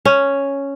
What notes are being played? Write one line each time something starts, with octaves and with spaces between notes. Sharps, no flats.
C#4